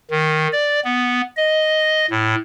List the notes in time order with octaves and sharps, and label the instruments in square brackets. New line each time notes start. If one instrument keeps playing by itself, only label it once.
[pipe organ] D#3
D5
B3
D#5
A2